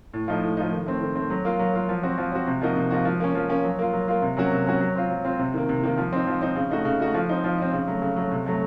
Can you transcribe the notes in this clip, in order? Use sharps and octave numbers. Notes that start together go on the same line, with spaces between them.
A2
F3 A3 D#4
A2
F3 A3 D#4
D#3
A3 C4
D#3
A3 C4
F#3
A#3 F4
F#3
A#3 F4
F3
C4 F#4
F3
C4 F#4
C3
F3 A#3 D#4 F#4
C3
F3 A#3 D#4 F#4
F3
A#3 C#4
F3
A#3 C#4
F#3
A#3 F4
F#3
A#3 F4
C3
F#3 A#3 C#4 F#4
C3
F#3 A#3 C#4 F#4
F#3
C4 F4
F#3
C4 F4
C3
D#3 A#3
C3
D#3 A#3
F3
C4 D#4
F3
C4 D#4
C#3
A3 D#4 F#4
C#3
A3 D#4 F#4
F3
C4 D#4
F3
C4 D#4
C#3
F#3 A3
C#3
F#3 A3
C3
F#3 A3